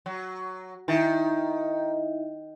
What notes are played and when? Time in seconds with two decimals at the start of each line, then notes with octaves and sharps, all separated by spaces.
0.06 F#3
0.88 D#3 D#4 E4 E5